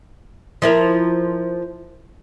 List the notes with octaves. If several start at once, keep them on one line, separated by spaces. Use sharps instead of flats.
F3 E4 A#4